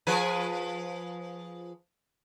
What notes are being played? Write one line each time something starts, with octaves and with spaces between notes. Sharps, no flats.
F3 G#4 B4